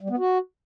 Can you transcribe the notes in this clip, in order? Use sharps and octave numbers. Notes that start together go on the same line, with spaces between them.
G3
B3
F#4